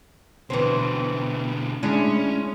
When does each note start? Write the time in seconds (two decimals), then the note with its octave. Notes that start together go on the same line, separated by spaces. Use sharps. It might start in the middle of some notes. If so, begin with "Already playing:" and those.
0.50 B2 D3 E3 C4
1.83 G#3 C#4 D4 E4